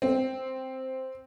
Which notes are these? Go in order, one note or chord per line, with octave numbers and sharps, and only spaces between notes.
C4